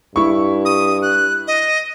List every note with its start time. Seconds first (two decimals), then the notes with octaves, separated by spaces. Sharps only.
0.16 G2 E4 C#6
0.65 D#6
1.02 F#6
1.47 D#5